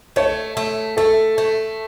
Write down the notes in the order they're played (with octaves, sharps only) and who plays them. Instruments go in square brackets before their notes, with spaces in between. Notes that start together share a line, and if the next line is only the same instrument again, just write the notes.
[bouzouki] A3 [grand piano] C#5
[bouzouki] A3
[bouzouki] A3 [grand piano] A4
[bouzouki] A3